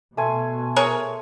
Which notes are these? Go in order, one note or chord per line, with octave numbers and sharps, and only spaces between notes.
B2 A3 C5 G#5
G#4 A#4 C#5